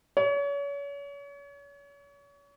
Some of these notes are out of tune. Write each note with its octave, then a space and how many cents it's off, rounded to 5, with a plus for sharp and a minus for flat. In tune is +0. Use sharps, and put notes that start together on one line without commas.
C#5 +35